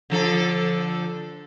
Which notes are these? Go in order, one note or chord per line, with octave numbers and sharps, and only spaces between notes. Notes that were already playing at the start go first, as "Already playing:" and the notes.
D3 F3 A4